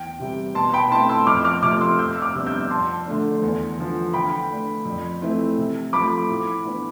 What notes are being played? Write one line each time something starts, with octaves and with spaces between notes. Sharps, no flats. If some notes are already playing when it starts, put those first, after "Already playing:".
Already playing: E2 G5
C3 G3
B2 A5 C6
G5 B5
A3 C4 E4 A5 C6
C6 E6
F2 D6 F6
D6 F6
C3 F3 A3 C4 D6 F6
C6 E6
F2 E6 G6
E6
D6 F6
C3 G3 B3 D4
E6 G6
F2 A5 C6
D3 A3 D4
E2
D3 F3
D3 G5 B5
A3 D4
F2
E3 A3 C4 E4
C3
F3 A3 B5 D6
A2
E3 B3 D4